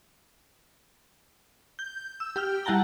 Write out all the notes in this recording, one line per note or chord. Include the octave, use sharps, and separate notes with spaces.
G6
E6
G4 G5 F6
G3 E4 F#5 A5 A#5 G7